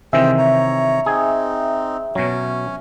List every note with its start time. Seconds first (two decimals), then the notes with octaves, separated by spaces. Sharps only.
0.13 C3 D#3 E3 G#4 C5 E5 G5
0.39 C#5 A#5
1.06 C4 D#4 G#4
2.15 B2 F#3 C#4